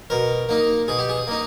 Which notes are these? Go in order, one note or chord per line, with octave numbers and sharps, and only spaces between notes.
B2 A#4
A#3 D#4
B2 G#4
G4
G#4
A#3 D#4